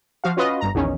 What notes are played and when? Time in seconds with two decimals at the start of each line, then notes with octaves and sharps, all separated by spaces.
0.24 F3 F#4 F5
0.37 C#4 F4 F#4 B4 D#5
0.61 G1 G2 A#5
0.74 A#1 E2 D#3 C#4